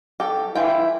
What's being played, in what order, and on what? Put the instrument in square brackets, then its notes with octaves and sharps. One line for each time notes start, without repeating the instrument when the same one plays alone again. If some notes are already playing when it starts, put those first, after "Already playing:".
[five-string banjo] G4 A4
[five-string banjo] E3 F4 G5 [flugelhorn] E4